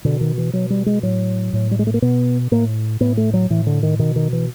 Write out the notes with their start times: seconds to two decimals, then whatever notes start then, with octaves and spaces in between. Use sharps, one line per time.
0.05 B2 D3
0.21 D#3
0.38 E3
0.53 B2 F#3
0.70 G3
0.86 G#3
1.03 A2 F#3
1.53 A2
1.71 G3
1.79 G#3
1.87 A3
1.94 A#3
2.02 B2 B3
2.51 A2 A#3
3.00 A2 B3
3.17 A3
3.34 F#3
3.50 A2 E3
3.67 D3
3.83 D#3
3.99 B2 D#3
4.16 D#3
4.33 E3